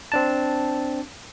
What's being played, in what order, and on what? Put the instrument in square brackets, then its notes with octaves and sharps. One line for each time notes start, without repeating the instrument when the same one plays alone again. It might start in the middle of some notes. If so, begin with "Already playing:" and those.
[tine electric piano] C4 D4 A5